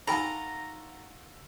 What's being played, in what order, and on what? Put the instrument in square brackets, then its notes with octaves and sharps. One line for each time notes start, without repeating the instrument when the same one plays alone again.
[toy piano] D#4 [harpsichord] F4 F#4 A4 [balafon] G5 G#5 B5 [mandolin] A#5